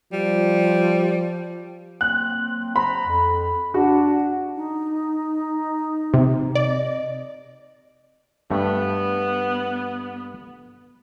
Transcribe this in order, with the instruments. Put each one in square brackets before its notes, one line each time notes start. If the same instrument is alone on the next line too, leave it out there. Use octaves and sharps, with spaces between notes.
[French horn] F3 [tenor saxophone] G3
[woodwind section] F#3 A#3 C4 [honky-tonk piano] F#6
[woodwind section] C5 A#5 [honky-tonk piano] B5
[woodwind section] F2
[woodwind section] D4 [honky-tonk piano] F#4
[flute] D#4
[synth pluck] C3
[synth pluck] D5 [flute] D#5
[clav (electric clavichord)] G2 A3 [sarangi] B3